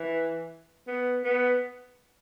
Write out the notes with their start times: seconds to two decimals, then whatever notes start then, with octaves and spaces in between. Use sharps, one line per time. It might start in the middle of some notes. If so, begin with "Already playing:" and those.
Already playing: E3
0.88 B3
1.24 B3